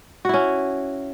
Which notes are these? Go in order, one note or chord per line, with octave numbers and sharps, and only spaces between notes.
C#4 E4 F#4